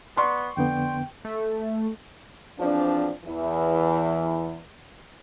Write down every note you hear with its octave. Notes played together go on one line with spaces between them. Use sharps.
B3 D5 C6 C#6
F2 D3 B3 G5
A3
E2 F3 C4 D4
E2 E3